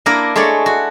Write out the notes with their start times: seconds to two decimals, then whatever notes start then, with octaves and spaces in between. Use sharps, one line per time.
0.06 A#3 D4 E4 A#4
0.36 G#3 A3 D4 C#5 D5
0.66 F#4